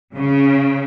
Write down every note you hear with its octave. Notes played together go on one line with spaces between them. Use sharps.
C#3